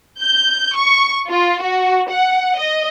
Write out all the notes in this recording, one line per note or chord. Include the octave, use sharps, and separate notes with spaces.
G6
C#6
F4
F#4
F#5
D#5